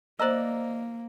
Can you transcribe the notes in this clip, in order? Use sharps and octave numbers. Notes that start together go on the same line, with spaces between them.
A#3 C5 D5 D#5 A#5 E6